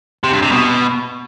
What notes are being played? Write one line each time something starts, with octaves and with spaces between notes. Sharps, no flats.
C3
G2
C3
B2